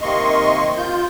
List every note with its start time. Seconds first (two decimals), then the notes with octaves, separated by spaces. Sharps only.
0.01 C3 D#3 A#3 D#5 C6 C#6
0.78 F4 G6